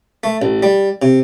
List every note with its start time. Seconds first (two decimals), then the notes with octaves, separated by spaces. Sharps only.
0.23 A3
0.42 A1
0.63 G3
1.02 C3